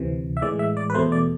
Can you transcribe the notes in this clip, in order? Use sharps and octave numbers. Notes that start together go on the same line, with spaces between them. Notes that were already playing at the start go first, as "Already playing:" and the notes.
Already playing: D2 C3 E3
E5
A2 E3 G#3 D5
E5
D5
B4
E2 B2 A3 C5
D5